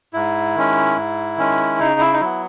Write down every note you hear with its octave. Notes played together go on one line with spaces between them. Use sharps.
G#2 E4
D#3 G#3 C#4
G#2
D#3 G#3 C#4
C#3 D#4
E4
D#4
F#3 B3 E4